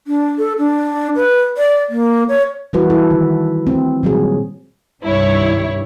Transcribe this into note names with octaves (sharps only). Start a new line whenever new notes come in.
D4
A4
D4
B4
D5
A#3
C#5
E3 F#3 G3 E4 F#4 B4
E4 A4
D#3
A3 C4
A#2 D#3 F#3 G3 F#4 G#4
C2 G2 D#3 G3 E4 C#5